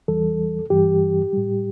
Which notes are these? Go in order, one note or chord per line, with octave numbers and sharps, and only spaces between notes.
E2 E3 G3 A4
G2 E3 G3 G4
A2 G3